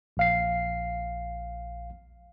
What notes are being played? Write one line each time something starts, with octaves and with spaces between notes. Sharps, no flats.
A#1 F5 C7